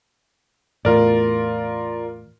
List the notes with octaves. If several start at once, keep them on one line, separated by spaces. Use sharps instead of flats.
E2 A2 F4 A#4 D5